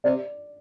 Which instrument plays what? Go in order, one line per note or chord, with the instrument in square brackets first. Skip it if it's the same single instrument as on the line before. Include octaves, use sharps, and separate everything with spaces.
[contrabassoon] C3 [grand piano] D5